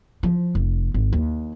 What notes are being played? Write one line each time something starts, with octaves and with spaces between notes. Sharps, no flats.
F3
F1
G#1
D#2